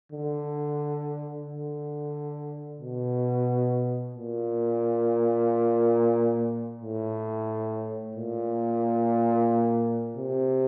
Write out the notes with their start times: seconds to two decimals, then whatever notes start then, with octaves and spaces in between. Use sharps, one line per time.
0.12 D3
1.46 D3
2.80 B2
4.15 A#2
6.82 A2
8.15 A#2
10.17 C3